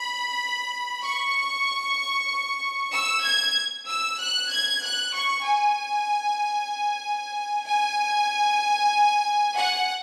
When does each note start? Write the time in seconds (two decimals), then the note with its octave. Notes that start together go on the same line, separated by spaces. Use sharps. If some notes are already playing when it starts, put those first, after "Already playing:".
Already playing: B5
1.03 C#6
2.93 E6
3.25 G#6
3.88 E6
4.20 F#6
4.51 G#6
4.83 F#6
5.15 C#6
5.46 G#5
7.67 G#5
9.57 F#5